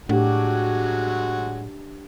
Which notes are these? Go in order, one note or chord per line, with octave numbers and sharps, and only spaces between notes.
A2 F#3 G#3 D4 F#4 G4